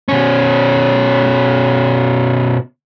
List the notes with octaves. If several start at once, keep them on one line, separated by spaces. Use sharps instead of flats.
B2 C#4